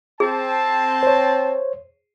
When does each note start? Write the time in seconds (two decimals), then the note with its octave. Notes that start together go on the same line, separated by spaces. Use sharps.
0.20 C4 G#4 A5
1.03 C5 C#5